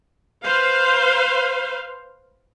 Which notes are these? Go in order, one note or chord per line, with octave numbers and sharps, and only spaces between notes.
B4 C5 F5